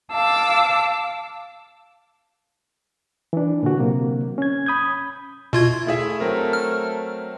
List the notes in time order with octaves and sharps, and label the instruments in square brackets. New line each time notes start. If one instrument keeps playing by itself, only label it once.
[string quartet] F5 A5 D6 E6
[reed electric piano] E3 D4
A#2 D3 F#4
C3 F#3 A#3
C#4 G#6
B5 D#6 G6 G#6
[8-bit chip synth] B2 F4 G#6 [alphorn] E4
[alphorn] A3 [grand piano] E4 G#4 E5
[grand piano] F#3 C4 A#4
[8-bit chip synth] F6